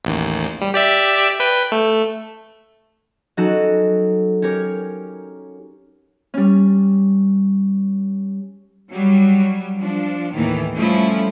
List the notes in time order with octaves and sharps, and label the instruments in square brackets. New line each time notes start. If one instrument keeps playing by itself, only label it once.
[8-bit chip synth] A1 D#2
G3
G4 D5 E5
B4 G5
A3
[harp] F#3 C#4 D#4 F#4 A4
C#4 G4 A#4 C#5
G3 C#4
[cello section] F#3 G3
F3 D4
D#2 A2 D#3 E3
F3 G3 A3 C#4 E4